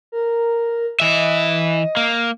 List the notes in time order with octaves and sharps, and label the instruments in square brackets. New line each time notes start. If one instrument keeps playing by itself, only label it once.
[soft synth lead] A#4
[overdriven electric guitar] E3 E5 [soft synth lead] D#5
[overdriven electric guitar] A#3